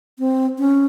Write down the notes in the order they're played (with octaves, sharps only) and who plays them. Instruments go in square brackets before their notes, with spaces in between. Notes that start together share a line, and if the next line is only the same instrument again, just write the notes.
[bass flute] C4
C#4